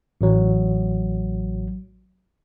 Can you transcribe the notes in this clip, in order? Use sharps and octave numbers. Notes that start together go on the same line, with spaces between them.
A1 F#3